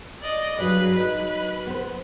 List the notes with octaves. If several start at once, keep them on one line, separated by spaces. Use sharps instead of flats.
D5 D#5
G2 F#3 G#4 B4
F#3 D#4 B4
B3 C5